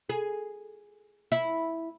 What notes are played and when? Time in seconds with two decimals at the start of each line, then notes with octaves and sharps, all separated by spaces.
0.09 G#4
1.32 E4